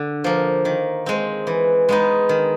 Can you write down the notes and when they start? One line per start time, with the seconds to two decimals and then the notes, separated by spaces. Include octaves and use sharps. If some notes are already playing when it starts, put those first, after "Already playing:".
Already playing: D3
0.24 F3 A#3
0.65 D#3
1.06 G#3 C4
1.47 E3
1.89 G#3 B3 D#4
2.29 D#3